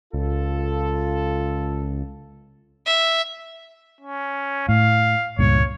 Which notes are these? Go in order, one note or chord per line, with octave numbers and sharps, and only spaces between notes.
C#2 F4 A4
E5
C#4
A2 F5
C#2 G2 A#2 C#5